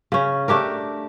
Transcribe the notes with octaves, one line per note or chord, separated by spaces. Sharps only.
C#3 C#4
A3 D4 G4 A#4